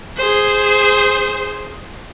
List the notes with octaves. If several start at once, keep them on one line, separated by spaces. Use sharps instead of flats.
G#4 C5